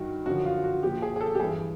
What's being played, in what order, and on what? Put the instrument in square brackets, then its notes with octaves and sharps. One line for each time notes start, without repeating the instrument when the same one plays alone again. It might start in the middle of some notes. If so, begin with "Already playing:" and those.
Already playing: [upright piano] G2 D#3 F#4
F#2 D3 F3 F#4
F4
F#4
A#2 F3 G4
G#4
G#4
A4
G4
G2 E3 G#4